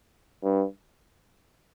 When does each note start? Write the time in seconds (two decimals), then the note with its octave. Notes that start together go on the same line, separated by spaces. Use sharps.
0.44 G2